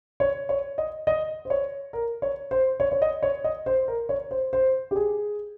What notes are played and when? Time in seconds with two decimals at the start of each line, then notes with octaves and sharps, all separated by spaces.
0.20 C#5
0.49 C#5
0.78 D#5
1.07 D#5
1.45 C5
1.50 C#5
1.93 A#4
2.22 C#5
2.51 C5
2.80 C#5
2.92 C#5
3.02 D#5
3.23 C#5
3.44 D#5
3.66 C5
3.88 A#4
4.09 C#5
4.31 C5
4.53 C5
4.91 G4
4.96 G#4